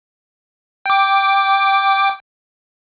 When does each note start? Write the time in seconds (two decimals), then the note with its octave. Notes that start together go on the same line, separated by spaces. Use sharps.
0.86 G5 D6